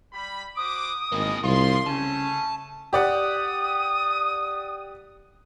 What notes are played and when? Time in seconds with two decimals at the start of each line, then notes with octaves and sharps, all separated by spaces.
0.13 G3 B5
0.57 F#4 C5 D6 D#6
1.12 G#1 A#3 E4 D#5
1.44 C2 F3 F4 C6
1.87 C#3 A3 C#4 A5 D#7
2.93 G4 D5 F#5 D#6